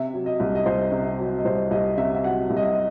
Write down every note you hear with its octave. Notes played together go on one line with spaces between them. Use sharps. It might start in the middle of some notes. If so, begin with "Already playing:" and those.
Already playing: C3 E5
F#3
D#5
C2
D#5
C2 C5
C3
F#3
D#5
C2 C5
C2 D#5
C3 E5
E5
F#3 F#5
C2
D#5
E5